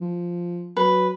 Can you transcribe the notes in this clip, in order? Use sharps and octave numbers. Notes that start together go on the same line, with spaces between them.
F3
F#3 B4